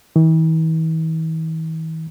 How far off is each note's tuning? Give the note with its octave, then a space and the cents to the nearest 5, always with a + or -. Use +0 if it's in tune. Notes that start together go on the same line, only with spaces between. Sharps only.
E3 -45